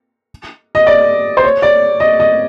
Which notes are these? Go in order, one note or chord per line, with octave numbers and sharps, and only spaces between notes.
D#5
D5
C5
C#5
D5
D#5
D#5